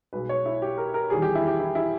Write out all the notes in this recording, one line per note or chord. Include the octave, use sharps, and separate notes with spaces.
B1 B2 G#3 B4
C#5
E4
G4
A#4
A#4
E2 D#3 G3 G#4
G4
E4
G4
E4
E4